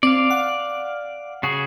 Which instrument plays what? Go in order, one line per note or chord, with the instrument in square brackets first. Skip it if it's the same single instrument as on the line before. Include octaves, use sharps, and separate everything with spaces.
[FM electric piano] C4 [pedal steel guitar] D5 F5
[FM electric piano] F#5
[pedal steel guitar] C#3 F#4 G#4 [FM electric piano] C7